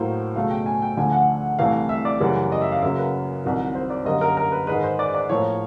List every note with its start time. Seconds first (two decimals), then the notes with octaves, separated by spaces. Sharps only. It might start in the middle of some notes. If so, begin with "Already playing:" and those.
Already playing: A2 F#3 A#3 C5
0.35 C#2 B2 F#3 A3 F5
0.51 G5
0.66 G#5
0.82 G5
0.97 D2 D3 F3 A3 G#5
1.12 F#5
1.59 C2 C3 E3 A3 F5
1.89 E5
2.05 D5
2.20 F#2 C#3 E3 G3
2.52 D#5
2.62 E5
2.72 F5
2.82 F#2 C#3 F#3 A#3 E5
2.98 B4
3.44 C2 C3 D#3 F#3
3.75 C5
3.90 D5
4.05 F#2 D3 G3 A#3 D#5
4.21 A#4
4.37 A#4
4.52 B4
4.67 G#2 D#3 G#3 B4
4.83 C5
4.99 D5
5.14 D5
5.29 A2 F3 A#3 C#5